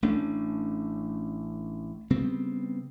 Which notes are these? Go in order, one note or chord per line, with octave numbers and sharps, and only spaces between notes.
A1 A3 C#4 D4
C#3 G3 B3 C4